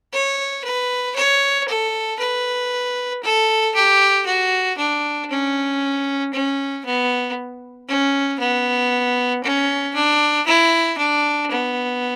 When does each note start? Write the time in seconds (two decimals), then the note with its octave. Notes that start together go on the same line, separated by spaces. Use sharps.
0.13 C#5
0.64 B4
1.16 C#5
1.68 A4
2.20 B4
3.23 A4
3.75 G4
4.26 F#4
4.78 D4
5.30 C#4
6.33 C#4
6.85 B3
7.89 C#4
8.40 B3
9.44 C#4
9.95 D4
10.47 E4
10.98 D4
11.50 B3